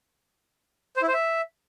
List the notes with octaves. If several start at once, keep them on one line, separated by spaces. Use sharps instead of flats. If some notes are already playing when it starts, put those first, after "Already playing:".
C5
E4
C5
E5